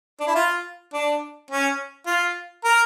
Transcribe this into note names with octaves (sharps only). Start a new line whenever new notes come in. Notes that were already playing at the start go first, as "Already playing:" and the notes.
D4
E4
F4
D4
C#4
F4
A#4